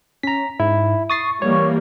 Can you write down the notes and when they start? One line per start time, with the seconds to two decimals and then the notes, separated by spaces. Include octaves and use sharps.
0.23 C#4 A#5 B6
0.60 G#2 E4
1.10 C#6 D#6 A6 C7
1.42 E3 G3 A#3 C#5